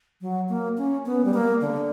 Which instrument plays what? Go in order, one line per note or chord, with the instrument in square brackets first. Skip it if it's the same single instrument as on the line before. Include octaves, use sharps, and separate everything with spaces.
[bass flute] F#3
A#3
C#4
B3
G3
A#3
D3